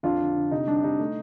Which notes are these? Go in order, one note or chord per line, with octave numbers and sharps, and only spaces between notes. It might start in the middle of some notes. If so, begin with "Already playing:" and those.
F2 D4 F4
D3
D3
C3 D#4
G3 D4
C3 D#4
A3